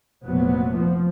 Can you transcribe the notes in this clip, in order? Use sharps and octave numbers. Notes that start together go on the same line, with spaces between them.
F1 A#2 F#3 B3
F3